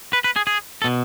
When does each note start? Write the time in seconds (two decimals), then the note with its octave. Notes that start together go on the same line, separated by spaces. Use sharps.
0.13 B4
0.24 B4
0.36 G#4
0.47 G#4
0.82 A4
0.84 B2